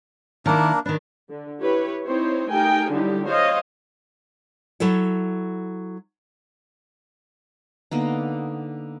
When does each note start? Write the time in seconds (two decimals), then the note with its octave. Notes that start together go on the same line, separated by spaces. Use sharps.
0.46 D#3 A#3 D4 E4 A#4
0.86 D#3 D4 B4
1.29 D3
1.61 E4 G4 B4 C#5
2.06 C4 D#4 E4 C5 C#5
2.50 A3 D#4 G4 A#4 G5 G#5
2.91 D3 F#3 G3 D#4 E4 G4
3.27 C5 C#5 D#5 F5
4.80 F#3 E4 A4 C#5
7.91 D3 A#3 B3 D#4